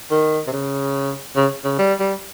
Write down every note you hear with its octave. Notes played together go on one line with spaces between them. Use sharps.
D#3
C3
C#3
C#3
C#3
G3
G3